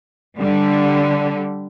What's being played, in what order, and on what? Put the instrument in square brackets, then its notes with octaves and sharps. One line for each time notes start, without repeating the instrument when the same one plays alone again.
[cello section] D3 G3